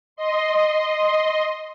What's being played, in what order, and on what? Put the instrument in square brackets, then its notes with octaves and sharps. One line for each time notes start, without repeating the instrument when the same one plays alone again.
[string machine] D#5 C6